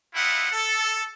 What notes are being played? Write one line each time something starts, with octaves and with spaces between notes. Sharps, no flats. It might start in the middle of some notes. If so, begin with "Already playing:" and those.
G3 A3 E4 F4 D#5 F#5
A4